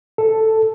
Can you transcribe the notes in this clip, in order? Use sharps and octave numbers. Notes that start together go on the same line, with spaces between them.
A4